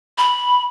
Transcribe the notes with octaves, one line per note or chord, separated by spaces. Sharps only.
B5